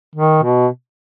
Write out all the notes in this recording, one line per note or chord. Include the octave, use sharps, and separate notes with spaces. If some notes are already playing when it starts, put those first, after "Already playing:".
D#3
B2